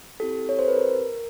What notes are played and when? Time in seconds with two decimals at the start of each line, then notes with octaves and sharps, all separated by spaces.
0.20 C4 E4 G4 A4
0.49 C#5
0.59 C5
0.68 B4
0.77 A#4